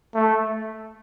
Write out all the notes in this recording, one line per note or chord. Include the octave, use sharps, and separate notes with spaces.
A3